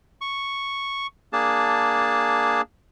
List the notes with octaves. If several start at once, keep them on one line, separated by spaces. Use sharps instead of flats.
C#6
A#3 D4 G#4 A5